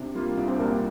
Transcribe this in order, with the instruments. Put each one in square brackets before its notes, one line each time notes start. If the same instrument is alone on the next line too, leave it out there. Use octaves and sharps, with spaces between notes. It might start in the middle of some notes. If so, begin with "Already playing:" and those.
Already playing: [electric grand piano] C3 [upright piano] D4
[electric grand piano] G3 A#3 F4
[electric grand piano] C2 [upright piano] D4
[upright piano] C4
[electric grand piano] A#2 G3 D4 [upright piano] A#3